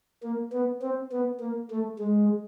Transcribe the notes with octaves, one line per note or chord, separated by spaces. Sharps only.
A#3
B3
C4
B3
A#3
A3
G#3